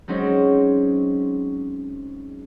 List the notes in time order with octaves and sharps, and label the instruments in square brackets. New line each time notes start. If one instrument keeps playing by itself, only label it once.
[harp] F#3 G#3 C4 C#4 D#4